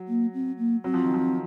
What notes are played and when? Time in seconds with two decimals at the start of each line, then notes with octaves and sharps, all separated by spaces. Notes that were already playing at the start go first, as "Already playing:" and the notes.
Already playing: F#3
0.08 A#3
0.34 C4
0.58 A#3
0.84 F#3 C4
0.94 F3
1.04 D#3
1.14 F3